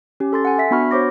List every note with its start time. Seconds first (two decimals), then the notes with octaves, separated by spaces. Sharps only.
0.20 C#4 G4
0.33 A4 C6 A6
0.45 F#5 G#5
0.59 E5 B6
0.71 B3 D4 F#4 B5 C#6 F6
0.91 F#4 C5 C#5 D6 A#6